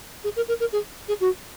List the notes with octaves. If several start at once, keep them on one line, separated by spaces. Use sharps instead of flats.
G#4
A#4
A#4
A#4
G#4
G#4
F#4